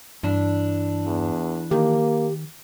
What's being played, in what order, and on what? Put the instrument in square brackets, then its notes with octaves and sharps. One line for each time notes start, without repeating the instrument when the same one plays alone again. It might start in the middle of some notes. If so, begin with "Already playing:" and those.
[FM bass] G2 [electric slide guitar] E3 D4
[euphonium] E2
[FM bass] D#3 [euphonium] A#3 [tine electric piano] G4